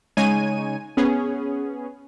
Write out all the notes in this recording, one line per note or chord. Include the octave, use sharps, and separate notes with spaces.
C#3 G#3 D#4 C#5 G#5 D#7
B3 C#4 G#4